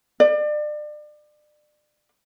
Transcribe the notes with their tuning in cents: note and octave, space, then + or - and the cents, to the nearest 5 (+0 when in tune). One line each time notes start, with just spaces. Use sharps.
D5 +35